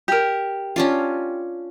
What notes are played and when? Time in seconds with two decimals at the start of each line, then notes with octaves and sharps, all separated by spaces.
0.08 G4 A#4
0.76 C#4 D4 F4